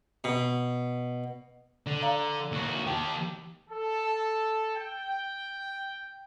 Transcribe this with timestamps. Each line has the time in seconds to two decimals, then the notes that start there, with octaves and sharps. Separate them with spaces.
0.24 B2
1.86 D3
2.02 D5 F5 A#5
2.52 D#2 F#4
2.87 D#3 G4 G5 A5
3.68 A4
4.75 G5